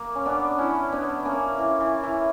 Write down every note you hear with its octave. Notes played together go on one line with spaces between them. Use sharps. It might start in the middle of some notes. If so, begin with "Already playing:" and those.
Already playing: A#3
C#4
B3 D4
C#4 E4
B3 D4
A#3 C#4
E3
E3
E3